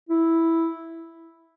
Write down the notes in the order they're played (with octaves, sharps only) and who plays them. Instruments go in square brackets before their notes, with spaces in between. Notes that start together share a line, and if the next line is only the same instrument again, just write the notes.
[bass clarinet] E4